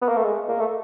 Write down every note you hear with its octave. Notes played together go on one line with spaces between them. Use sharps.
B3
A#3
A3
G#3
A#3
A3